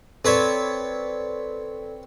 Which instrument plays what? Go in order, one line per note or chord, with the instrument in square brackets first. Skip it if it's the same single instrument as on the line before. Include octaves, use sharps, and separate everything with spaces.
[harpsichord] C4 B4 C#5 [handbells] A4 D5